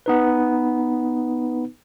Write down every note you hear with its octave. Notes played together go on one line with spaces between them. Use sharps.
B3 D#4 B4